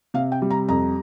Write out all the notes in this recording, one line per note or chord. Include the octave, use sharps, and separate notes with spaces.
C3 F5
G5
G3
A#5
F2 A#5